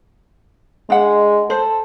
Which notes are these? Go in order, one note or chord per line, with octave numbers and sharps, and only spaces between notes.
G#3 D4 F#5
A4 C5